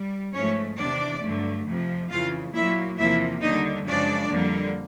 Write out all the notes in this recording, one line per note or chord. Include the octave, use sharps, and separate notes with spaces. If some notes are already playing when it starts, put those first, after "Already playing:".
Already playing: G3
G#2 F3 A3 C#4 C#5
E2 C3 D#3 D4 D5
G2 D3 F#3 A3
F2 C3 F3
F2 C#3 E3 F4 F5
A#2 F#3 A#3 E4 E5
E2 C3 F3 A#3 E4 E5
D#2 D3 G3 D#4 D#5
F#2 C#3 F3 G#3 D4 D5
F2 D3 G3 A#3